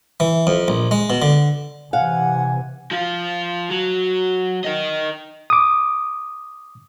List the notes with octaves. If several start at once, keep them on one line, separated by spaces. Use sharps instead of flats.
E3
F2
A#1
G#3
B2
D3
C3 E3 F5 F#5 G#5
F3 F4
F#3
A#4 D#5
D6 D#6